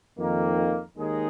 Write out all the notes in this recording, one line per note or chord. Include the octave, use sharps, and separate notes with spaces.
F2 D#3 A#3
D#2 D#3 G#3 D#4 G#4